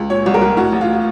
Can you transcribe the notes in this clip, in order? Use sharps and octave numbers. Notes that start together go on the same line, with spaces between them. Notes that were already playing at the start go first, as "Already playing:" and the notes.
Already playing: C#2
A#2 C#5
C2
A#4
C2
A2 F#4
A1
F4